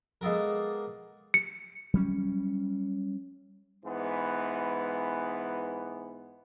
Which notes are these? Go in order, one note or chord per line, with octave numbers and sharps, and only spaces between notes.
G#3 A#3 B3 A4 A#4
C#7
F#3 G3 C#4
G#2 E3 B3